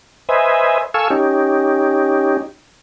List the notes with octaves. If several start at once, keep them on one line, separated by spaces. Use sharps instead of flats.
B4 C5 D#5 E5 G#5
A4 F5 G#5 C#6 E6
C#4 D#4 G4